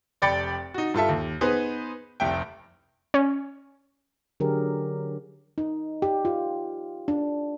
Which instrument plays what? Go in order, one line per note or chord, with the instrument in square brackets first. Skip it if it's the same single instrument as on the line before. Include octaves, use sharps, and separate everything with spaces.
[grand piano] F1 D5 G5 B5 A6 C#7
D#4 F#4
G2 F4 A4 E5
D#2
B3 D#4 G#4 B4 C5
F1 C2 E5 G5
[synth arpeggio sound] C#4
[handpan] D3 F#3 G4 G#4 A#4
D#4
G4
F4
D4